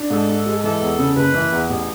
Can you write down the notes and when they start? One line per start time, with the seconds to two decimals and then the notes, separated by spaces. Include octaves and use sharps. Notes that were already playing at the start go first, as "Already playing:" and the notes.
Already playing: D4
0.10 G#2 A4
0.28 G#2
0.46 G#3
0.63 E3 A4
0.81 E2
0.99 C#3
1.16 F#1 B4
1.34 E3
1.52 E2
1.70 A1